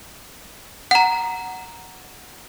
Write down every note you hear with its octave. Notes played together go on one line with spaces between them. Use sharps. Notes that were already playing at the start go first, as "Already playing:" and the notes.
F#5 A#5